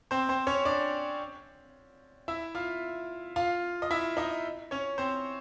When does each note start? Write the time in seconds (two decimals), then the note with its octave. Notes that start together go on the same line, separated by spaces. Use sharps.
0.11 C4 C5
0.29 C4 C5
0.47 C#4 C#5
0.65 D4 D5
2.28 E4 E5
2.55 F4 F5
3.36 F4 F5
3.82 D#5
3.91 E4 E5
4.17 D#4 D#5
4.71 C#4 C#5
4.98 C4 C5